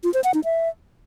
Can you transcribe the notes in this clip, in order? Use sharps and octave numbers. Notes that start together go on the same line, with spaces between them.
F4
C5
F#5
D#4
E5